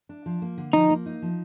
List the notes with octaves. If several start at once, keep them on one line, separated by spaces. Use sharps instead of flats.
D4
F3
A#3
D3
F3 D#4
A#3
D#4
F3